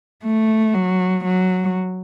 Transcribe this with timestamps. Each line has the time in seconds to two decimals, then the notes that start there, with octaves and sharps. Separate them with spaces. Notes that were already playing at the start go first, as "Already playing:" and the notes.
0.24 A3
0.74 F#3
1.25 F#3